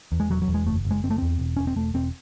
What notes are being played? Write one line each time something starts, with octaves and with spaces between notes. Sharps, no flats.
E2
G#3
E1 F#3
F#3
E2
G#3
F#1 A3
F#1
G#3
F#1 C4
A3
E2 C4
E1
E1 C#4
C4
E1 A3
E1 C4